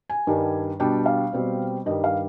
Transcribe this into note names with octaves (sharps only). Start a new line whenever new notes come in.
G#5
G2 D#3 G3 D4
B2 G3 D4 G5
F5
B2 G3 C4
G2 D#3 G3 D#5
F5